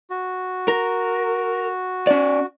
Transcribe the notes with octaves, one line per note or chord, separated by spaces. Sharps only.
F#4
A#4
C#4 D5